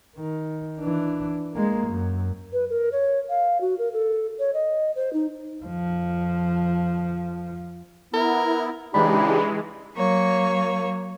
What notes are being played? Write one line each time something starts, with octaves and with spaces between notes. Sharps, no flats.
D#3
E3 D4
G#3 A#3
F#2
B4
A#4
C#5
F5
F#4
A#4
A4
C#5
D#5
C5
D#4
F2 F3
B3 E4 A#4
C#3 E3 G#3 D4 D#4 G4 B5
F#3 A#3 C#5